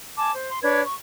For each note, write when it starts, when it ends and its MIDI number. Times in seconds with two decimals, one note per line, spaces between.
0.18 0.32 80
0.18 0.32 81
0.18 0.32 86
0.34 0.47 72
0.49 0.60 84
0.64 0.81 62
0.64 0.81 71
0.64 0.81 73
0.64 0.81 92
0.84 0.94 85